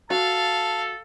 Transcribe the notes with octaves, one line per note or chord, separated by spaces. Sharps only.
F#4 A4 F5 A5